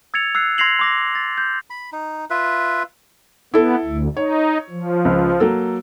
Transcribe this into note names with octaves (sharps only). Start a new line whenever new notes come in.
E6 G#6 A6 C#7 F7
E6 F#6 C7
C6 G#6 A#6 C7 F7 F#7
C6 D6 A#6
A6
G6
B5
D#4
F4 B4 E5
B3 E4 A4
D2
D#4 C#5
F3
C#2
F#3 A#3 A4